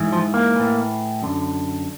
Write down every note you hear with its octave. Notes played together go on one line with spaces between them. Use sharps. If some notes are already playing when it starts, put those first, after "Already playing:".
Already playing: G#2 E3
F3
A#3
A2 E3
F#2 D3